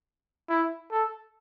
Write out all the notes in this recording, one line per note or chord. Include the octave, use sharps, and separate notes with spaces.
E4
A4